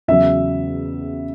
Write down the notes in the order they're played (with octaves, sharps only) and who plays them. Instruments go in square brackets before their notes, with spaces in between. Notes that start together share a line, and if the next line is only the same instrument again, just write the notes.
[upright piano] E2 C#3 F#3 E5